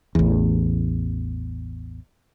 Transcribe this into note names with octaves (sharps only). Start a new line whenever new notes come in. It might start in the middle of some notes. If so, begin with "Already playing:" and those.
A1 E2